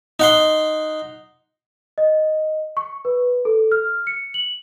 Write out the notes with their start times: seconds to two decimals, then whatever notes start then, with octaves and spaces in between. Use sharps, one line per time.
0.20 D#4 F#5 C6
1.98 D#5
2.77 C#6
3.05 B4
3.45 A4
3.72 F6
4.07 C#7
4.34 F#7